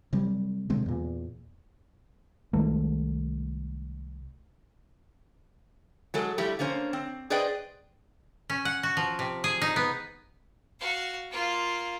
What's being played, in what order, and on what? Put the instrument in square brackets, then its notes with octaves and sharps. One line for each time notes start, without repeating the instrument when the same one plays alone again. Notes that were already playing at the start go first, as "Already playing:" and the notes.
[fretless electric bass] C3 F#3 G3 C4
B2 D3 G#3 C4
E2 A#2
[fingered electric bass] C2 D#3 G#3 A3
[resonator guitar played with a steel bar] F#3 G#3 A4
F3 G3 A3 E4 G4
D3 A#3 C#4 C5
C4
G#4 B4 C5 D5 D#5 G5
[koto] C#4
F#5
F#4
F3
C3
G#4
D#4
B3
[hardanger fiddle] F#4 F5
A#3 F4